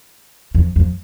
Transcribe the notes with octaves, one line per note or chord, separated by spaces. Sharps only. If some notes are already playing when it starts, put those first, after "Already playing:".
F2
F2